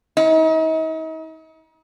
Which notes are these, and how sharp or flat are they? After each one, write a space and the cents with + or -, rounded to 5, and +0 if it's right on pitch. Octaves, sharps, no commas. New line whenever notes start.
D#4 +40